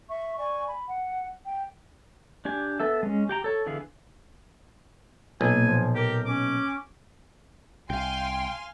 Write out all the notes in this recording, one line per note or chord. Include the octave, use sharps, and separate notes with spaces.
E5 C#6
D5 G#5 C#6
B5
F#5
G5
D4 G4 G#5
B3 A4 E5
G#3 C#4
G4 G5 A#5
A4 C#5
D3 E3 B3 G#4 F5
B1 A#2 G#5
F3
G4 A#4
C#4 D6
C2 F5 G5 G#5 C6